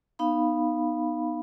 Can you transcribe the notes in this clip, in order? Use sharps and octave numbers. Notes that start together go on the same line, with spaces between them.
B3 D#4 F5 B5